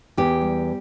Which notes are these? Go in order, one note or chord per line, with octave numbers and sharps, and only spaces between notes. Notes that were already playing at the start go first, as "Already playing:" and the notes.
E2 G4
G3